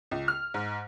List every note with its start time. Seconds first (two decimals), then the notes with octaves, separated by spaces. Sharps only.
0.11 C#2
0.28 F6
0.54 G#2